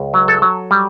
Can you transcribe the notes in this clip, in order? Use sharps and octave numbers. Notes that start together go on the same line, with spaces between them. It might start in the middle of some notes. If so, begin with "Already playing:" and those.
Already playing: C#2
F#3
A4
F#3
G3